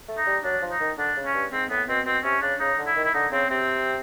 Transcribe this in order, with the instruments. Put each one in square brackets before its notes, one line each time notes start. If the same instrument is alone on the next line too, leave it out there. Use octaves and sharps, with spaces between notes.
[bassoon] A3
[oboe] D#4
[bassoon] G3
[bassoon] F#3 [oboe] D4
[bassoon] F3
[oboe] D#4
[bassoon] D#3
[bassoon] D3 [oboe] D4
[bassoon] C#3
[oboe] C#4
[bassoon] G2
[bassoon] G#2 [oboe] C4
[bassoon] A2 [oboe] B3
[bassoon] B2 [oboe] C4
[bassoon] B2 [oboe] C4
[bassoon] C3 [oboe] C#4
[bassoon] C#3 [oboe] D4
[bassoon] C#3 [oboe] D#4
[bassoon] D3
[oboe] E4
[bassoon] D#3
[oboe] E4
[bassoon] D3 [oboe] D#4
[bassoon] C#3 [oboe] C4
[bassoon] C3 [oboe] C4